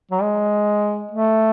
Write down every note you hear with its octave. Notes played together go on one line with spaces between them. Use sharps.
F#3
G#3
A3